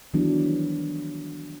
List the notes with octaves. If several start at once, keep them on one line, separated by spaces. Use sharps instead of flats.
D#3 E3 F#3 G3 B3 D4